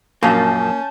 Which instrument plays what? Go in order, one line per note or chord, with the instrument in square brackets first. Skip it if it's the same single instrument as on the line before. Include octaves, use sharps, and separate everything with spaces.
[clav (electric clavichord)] A#1 F#2 [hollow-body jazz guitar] A#3 [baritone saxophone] C#4 [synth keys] A5 G6